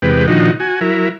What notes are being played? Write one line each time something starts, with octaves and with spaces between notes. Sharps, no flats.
E2 C3 G#3 G4 B4
A#2 D3 D#3 F3 D#4 F#4
F#4 G#5
F#3 E4 A#4